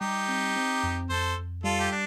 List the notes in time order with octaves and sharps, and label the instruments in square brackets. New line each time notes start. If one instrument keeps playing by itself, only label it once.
[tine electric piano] G3 [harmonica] D#4 G4
[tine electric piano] C4
C4
F2
[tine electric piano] F2 [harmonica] A4 C5
[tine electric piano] F2
[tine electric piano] G3 [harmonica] F4 A4
[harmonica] G4
D4